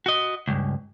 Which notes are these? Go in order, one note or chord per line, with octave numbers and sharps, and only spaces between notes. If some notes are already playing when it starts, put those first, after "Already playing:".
F#4 D#5
C#2 G2